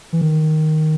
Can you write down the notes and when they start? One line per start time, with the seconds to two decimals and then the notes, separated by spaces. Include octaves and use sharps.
0.13 E3
0.21 D#3